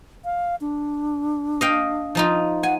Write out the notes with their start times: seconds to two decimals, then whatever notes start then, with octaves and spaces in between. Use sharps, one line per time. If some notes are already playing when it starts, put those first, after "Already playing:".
0.25 F5
0.61 D4
1.61 D#5 F5 G5
2.15 F3 D#4 F4
2.63 F#5 G#5